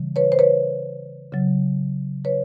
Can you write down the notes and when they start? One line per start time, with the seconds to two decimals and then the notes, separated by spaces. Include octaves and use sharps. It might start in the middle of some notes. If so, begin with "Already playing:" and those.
Already playing: C#3 E3 G3
0.16 B4 C#5
0.32 C5
0.39 B4 C#5
1.32 C#3 F#3
2.25 B4 C#5